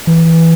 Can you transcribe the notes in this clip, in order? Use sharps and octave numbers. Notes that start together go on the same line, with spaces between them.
E3